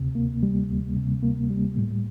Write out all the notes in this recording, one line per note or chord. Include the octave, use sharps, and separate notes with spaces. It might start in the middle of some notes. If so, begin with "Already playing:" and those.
Already playing: D2 C3
A#3
G3
D2
C3
A#3
G3
A2